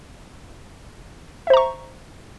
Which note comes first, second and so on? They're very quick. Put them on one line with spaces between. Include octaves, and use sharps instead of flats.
E5 C5 A#5 C#6